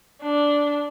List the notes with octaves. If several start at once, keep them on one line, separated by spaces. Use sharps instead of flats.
D4